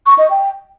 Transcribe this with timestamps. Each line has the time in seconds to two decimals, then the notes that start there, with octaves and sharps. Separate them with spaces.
0.06 C#6
0.18 D#5
0.30 G5